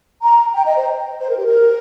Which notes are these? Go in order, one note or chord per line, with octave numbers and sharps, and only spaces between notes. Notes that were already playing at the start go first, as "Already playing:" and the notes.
A#5
G5
D#5
C5
C5
A#4
G4
A#4